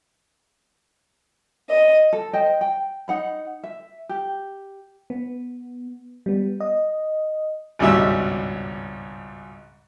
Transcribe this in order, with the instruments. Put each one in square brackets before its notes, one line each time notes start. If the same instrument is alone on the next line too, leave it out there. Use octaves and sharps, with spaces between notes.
[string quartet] D#5
[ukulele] A4
C5 D#5 G5
G5
D#4 F#5 B5
E5
G4
[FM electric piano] B3
G3 B3
D#5
[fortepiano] G#1 C#2 G2 B2 G3 E5